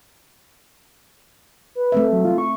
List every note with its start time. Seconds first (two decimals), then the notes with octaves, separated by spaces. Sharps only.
1.75 B4
1.92 A3 C4 E5
2.12 F#3
2.25 F4
2.38 C#6